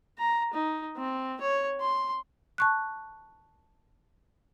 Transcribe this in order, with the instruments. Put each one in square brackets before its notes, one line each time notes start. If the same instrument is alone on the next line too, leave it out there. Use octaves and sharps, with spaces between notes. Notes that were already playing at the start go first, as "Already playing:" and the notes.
[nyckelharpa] A#5
D#4
C4
C#5
C6
[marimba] A5 C#6 F#6